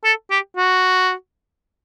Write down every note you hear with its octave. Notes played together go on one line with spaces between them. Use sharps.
A4
G4
F#4